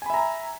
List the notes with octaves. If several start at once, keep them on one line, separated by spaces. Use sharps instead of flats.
E5 G#5 A#5 B5